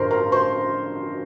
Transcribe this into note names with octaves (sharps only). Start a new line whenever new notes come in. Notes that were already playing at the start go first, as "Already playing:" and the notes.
Already playing: A1 G2 D3 F3 A#4 C5 A#5 C6
A#4 A#5
C5 C6